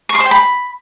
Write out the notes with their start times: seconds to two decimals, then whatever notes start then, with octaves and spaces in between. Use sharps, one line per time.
0.09 C#6
0.15 C6
0.20 C5
0.26 G5
0.31 B5